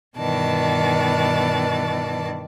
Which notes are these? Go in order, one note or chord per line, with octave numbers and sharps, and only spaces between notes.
G2 B2 D#3 E3 D5 A5